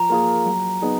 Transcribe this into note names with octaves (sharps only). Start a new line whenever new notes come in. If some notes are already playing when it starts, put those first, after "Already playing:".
Already playing: F3 A#5
A#3 F4 G#4
F#3
B3 D#4 G#4